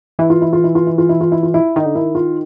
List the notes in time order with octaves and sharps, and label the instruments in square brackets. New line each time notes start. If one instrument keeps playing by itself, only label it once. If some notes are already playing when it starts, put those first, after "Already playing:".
[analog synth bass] E3 [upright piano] E4
[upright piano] F4
E4
F4
E4
F4
E4
F4
E4
F4
E4
F4
E4
[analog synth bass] D#3 [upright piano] D#4
[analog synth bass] D3
[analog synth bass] D#3 [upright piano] E4
[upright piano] F4